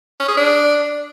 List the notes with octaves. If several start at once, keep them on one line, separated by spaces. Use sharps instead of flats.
C#4
G#4
D4